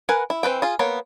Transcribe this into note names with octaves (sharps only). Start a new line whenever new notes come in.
A#4 B4 F#5 G#5
E4
E3 C4 B4 G5
F4 G#4
A#3 B3 C#5